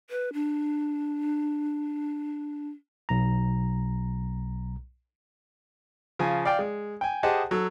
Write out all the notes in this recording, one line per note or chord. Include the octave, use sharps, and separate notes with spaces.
B4
D4
B1 A#5
C#3 F3 G#5
D5 F5 G5
G#3
G5 G#5
G4 G#4 C5 D#5 F#5 A5
F#3 A4